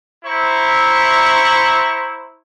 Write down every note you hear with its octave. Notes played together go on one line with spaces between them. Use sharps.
E4 C5 E5 A#5 C#6